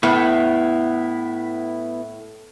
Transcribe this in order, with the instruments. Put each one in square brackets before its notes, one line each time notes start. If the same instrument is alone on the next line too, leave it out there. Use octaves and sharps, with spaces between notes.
[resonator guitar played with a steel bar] A2 [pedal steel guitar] B3 E4